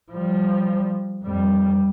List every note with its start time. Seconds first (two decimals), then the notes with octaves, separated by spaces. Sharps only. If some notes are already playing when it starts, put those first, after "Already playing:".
0.11 F3 G3
1.24 F2 G3